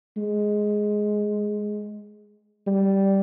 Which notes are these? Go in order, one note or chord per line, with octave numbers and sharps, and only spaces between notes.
G#3
G3